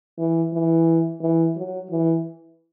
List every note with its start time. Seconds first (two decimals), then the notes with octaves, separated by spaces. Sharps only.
0.18 E3
0.53 E3
1.21 E3
1.57 F#3
1.90 E3